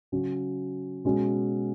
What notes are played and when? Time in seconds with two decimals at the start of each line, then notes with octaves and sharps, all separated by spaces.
0.12 C#3 F#3 C#4
1.05 B2 G#3 C#4